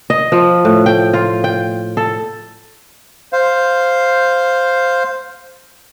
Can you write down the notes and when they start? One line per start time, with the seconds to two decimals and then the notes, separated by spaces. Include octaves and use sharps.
0.10 D#5
0.32 F3
0.65 A2
0.86 G5
1.13 F4
1.44 G5
1.97 A4
3.33 C5 F5